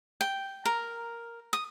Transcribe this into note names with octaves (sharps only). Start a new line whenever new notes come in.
G5
A#4
D#6